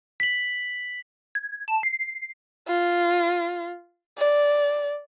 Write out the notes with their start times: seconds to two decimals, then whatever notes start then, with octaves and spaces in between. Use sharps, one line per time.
0.20 B6 F#7
1.35 G#6
1.68 A5
1.83 C7
2.68 F4
4.18 D5